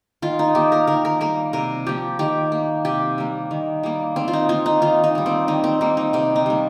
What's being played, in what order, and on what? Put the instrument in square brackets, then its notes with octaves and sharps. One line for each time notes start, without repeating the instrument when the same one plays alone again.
[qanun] D#3 F4
D#4
A#3 G4
A#4
D#3 A#4
A#4
G3 A#3 A#4
C3 A#4
F3 A#3 G4
D#3 G4
A#3
C3 G4
G3 A#3
D#3
G3 A#3
D#3 C4
F4
D#4
A#3 F4
D#4
D#3 F4
D#4
G3 A#3
C4
D#3 D#4
C4
G3 A#3 D#4
D#4
C3 C4
D#4
G3 A#3